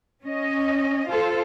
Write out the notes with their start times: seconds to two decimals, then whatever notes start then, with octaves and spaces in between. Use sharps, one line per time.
0.23 C#4 D#5
1.09 F4 A4 C5